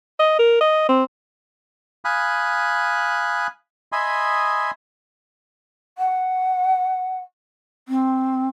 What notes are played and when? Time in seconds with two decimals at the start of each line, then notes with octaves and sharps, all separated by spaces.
0.19 D#5
0.39 A#4
0.61 D#5
0.89 C4
2.05 F5 G#5 B5 D#6 F#6
3.92 D#5 E5 G#5 B5 C6 D#6
5.97 F#5
7.88 C4